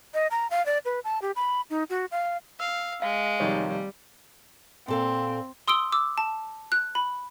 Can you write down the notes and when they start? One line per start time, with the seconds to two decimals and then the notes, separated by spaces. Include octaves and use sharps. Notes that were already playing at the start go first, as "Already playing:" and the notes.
0.14 D#5
0.31 A#5
0.50 F5
0.66 D5
0.85 B4
1.04 A5
1.22 G4
1.36 B5
1.70 D#4
1.90 F#4
2.11 F5
2.60 F5 E6
3.02 G#3 F5
3.40 F1 D#3 G3 C#5
4.88 A#2 C4 A4 F5
5.68 C6 D#6 E6 D7 G7
5.92 D6 E6
6.18 A5
6.72 F#6
6.95 B5